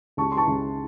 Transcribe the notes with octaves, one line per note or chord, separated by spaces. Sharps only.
C#2 A5 C#6
C6
A5 C#6
C#2